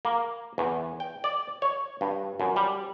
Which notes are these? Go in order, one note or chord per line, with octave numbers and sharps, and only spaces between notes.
A#3
E2
G5
D5
C#5
G2
F#2
G3